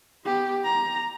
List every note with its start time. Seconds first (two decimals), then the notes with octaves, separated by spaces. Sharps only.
0.24 B3 G4
0.64 A#5